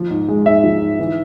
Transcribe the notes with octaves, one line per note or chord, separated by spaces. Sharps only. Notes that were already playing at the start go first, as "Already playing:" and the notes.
Already playing: F3
G#2
G#3
G#2 E5
F3
G#2
E3